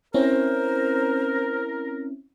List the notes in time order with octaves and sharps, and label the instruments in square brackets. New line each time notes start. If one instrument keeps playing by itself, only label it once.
[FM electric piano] C4 C#4 E4 [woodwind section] A#4 [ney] C5